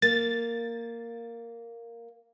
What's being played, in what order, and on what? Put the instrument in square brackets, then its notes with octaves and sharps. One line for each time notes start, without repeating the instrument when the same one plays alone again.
[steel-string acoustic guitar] A#3 [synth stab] A6